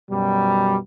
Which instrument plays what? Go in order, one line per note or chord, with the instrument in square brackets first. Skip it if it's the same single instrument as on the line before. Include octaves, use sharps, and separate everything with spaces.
[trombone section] F#2 B2 G3